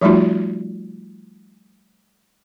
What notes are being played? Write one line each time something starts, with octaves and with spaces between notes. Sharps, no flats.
F3 G3 A3 D#4 F4 F#4